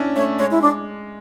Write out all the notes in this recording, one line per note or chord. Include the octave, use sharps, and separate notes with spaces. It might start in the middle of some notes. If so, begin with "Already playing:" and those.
Already playing: C#4 D4 E4
A3 C#5
G#3 C#5
E4
D4